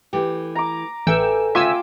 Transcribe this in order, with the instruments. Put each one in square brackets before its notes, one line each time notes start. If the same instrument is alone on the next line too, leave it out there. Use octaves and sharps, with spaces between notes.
[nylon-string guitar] E3 A3 G4
[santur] A#5 D6
[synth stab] A1 G5 E6 [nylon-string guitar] A4 B4 E5 [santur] G#5
[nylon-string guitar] D2 C#3 [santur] F4 G5 D6 [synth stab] E5 G#5 E6